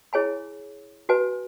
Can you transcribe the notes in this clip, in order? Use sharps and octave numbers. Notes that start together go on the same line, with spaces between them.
E4 G#4 C#5 G#5 B5
F#4 B4 G#5